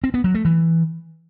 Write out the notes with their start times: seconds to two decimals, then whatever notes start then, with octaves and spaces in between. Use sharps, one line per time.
0.04 C4
0.14 B3
0.24 F#3
0.34 A3
0.45 E3